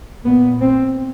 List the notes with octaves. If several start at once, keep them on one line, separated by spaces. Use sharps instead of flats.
A#2 B3
C4